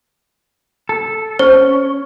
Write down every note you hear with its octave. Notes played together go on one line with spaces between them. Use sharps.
A4
C#4 C5